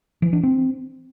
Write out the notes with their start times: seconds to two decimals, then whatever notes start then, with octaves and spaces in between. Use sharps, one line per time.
0.22 E3
0.33 D4
0.43 C4